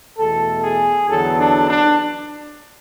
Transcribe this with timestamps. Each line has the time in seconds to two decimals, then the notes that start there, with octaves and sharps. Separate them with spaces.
0.19 E2 B2 A3 A4
0.64 G#4
1.09 E2 D3 F#3 B3 A4
1.40 D4
1.70 D4